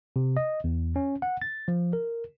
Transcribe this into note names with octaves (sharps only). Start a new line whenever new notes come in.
C3
D#5
E2
C#4
F#5
A6
F3
A#4